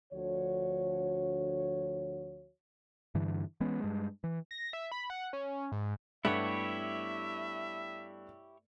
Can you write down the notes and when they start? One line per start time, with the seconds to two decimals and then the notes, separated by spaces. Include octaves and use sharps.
0.13 D2 D3 F3 F#4 C#5
3.15 G2 D3 E3
3.60 E3 G#3 B3 C#4
3.80 G2 G#3
4.24 E3
4.51 A#6
4.73 E5
4.92 B5
5.10 F#5
5.33 C#4
5.72 G#2
6.25 G2 A3 B3 E4 G4 C#5 E5 F#5